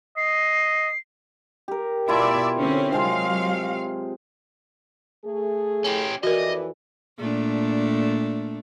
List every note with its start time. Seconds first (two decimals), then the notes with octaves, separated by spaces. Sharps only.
0.17 D#5 C7
1.68 G4 A#4
2.08 B2 E4 F4 D5 E5 A5
2.56 D3 C4 C#4
2.93 C3 F#3 G#3 F4 F5
5.25 A3 G#4
5.84 C#4 G4
6.23 F2 E3 F#4 A#4 D5 D#5
7.17 A#2 A3 D4